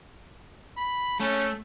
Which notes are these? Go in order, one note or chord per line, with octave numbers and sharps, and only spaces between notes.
B5
A3 C#4